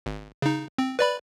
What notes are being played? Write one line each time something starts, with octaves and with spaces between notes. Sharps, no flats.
G#1
C#3 D#4
C4
B4 D5 B5